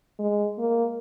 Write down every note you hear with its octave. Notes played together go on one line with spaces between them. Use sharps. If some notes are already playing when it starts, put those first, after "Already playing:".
G#3
A#3